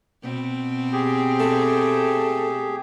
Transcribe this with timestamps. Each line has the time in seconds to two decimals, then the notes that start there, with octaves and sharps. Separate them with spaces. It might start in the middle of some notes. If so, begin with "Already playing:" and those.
0.23 B2 C4
0.93 G4 G#4
1.40 A3